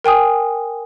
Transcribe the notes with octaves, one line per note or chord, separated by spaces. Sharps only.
A#4 G5 G#5 D#6